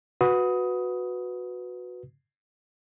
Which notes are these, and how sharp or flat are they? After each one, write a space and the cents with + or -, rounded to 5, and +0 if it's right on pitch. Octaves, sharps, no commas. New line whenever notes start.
F#4 -15 B4 +0 D#6 +15